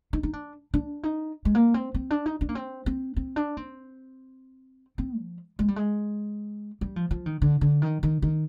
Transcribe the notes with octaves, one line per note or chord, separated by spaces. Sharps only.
D#4
D#4
D4
D4
D#4
G#3
A#3
C4
C4
D4
D#4
D4
A#3
C4
C4
C4
D4
C4
C4
F3
G#3
G3
G#3
G3
F3
F3
D#3
D3
D3
D#3
D#3
D#3